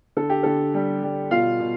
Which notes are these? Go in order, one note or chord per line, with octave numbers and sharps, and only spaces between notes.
D3 A4
G4
D3 A4
G3
G3
B2 F4 F5
B2